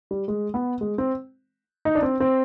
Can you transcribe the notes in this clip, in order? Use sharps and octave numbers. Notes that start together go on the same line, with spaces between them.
G3
G#3
B3
G#3
C4
D#4
D4
C4
C4